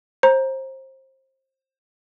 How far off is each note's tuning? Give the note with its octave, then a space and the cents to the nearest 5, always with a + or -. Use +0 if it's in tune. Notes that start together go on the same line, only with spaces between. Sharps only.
C5 +25 A#5 +10